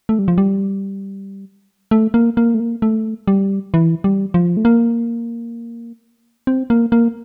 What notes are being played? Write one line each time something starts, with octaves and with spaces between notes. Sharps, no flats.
A3
G3
F3
G3
A3
A#3
A#3
A3
A#3
A3
G3
E3
G3
F3
A3
A#3
C4
A#3
A#3